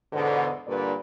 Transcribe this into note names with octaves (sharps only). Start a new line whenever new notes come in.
E2 G#2 B2 D3
G2 A#2 D3 B4 D5